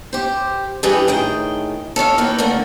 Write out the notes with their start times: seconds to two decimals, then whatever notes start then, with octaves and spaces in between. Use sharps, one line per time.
0.13 G4 C5
0.83 G2 E3 G4 G#4 B4 G5
1.07 A2 D#3 G#4 G5
1.96 A4 C#5 D5 F5
2.18 D#3 E3 A#3 B4 G5
2.38 D3 A3 A#3